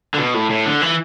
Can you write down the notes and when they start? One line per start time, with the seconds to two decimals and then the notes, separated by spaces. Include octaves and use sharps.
0.14 D3
0.18 B2
0.34 A2
0.50 A2
0.66 D3
0.82 E3